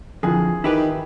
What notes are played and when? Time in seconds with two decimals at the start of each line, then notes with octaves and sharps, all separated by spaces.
0.23 F2 D3 E3 F4 G#4
0.64 D#3 E4 G4 B4